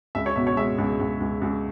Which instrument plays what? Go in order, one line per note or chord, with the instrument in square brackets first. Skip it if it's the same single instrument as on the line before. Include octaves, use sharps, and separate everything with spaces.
[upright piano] C#2 E5
C#5
B2 E5
C#5
G#3 E5
C#2
C#2
C#2
C#2